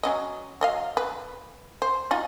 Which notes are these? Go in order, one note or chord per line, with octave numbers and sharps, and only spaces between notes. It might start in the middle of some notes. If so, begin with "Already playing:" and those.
F#3 C#4 D#5
F#3 D#5 F5
B4
C5
D#4 F4 F#4